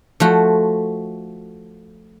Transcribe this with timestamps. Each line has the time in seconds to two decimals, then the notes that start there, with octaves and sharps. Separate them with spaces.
0.20 F3 A3 F#4